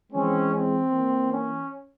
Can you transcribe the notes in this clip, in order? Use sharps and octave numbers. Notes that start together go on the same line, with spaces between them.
E3 G#3 C4 C#4
C4
E3 A#3
C#4